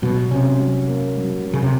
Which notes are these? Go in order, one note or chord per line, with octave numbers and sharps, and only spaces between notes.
B2 F#3
C3 C#4
F#3
A#3
F#3
F#3
C#3
C3